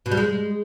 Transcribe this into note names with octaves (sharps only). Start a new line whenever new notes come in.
B2
G3
G#3